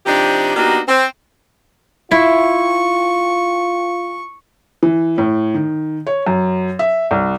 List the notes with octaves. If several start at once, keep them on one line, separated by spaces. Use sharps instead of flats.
C3 F3 D4 D#4 G4
A#3 B3 D4 D#4 F#4 G4
C4
E4 F4 C#6
E3
A2
D#3
C#5
F#2
E5
C2